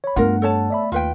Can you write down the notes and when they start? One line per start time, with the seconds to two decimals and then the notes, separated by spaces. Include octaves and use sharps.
0.04 C#5 B5
0.16 G2 A3 B3 F4 A#4 F#5
0.42 A4 C#5 A5
0.70 D5 E5 B5
0.92 D#2 F4 B4 G5